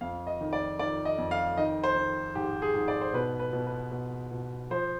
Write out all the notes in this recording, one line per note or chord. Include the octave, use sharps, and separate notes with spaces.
F2 F5
D#5
D#3
D5
D#3 D5
D#5
F2
F5
D#3 D#5
C5
D#3
G#2 G4
G#4
G#2
D5
C5
B2 B4
B4
B2
B4
B2
B2
F3 C5